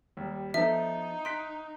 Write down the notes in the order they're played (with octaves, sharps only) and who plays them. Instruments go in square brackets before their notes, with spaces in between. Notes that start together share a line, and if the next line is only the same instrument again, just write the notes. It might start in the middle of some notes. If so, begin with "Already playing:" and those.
[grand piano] D#2 G3
[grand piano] F3 B3 A4 [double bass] D#4 [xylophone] E5
[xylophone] C6 [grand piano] F#6 B6 D7